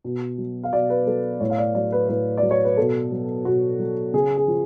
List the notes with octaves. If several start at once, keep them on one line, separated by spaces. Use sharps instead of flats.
B2
F#3
F5
B2 D5
B4
F#3 A4
A2 C#5
F5
D5
F#3 D5
B4
A2 B4
D5
F#3
C#5
B4
B2 A4
F#3
B2 F#4
F#3
C#3 G#4
G#4
F3